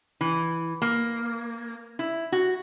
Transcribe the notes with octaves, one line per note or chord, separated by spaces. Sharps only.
E3
A#3
E4
F#4